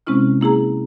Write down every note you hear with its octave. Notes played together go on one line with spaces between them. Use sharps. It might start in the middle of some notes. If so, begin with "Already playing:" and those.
C3 G#3 C4 C#4 E4 F6
A#3 E4 G#4 A#5